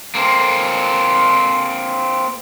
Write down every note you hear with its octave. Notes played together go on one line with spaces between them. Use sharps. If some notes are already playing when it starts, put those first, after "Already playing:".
A#3 C4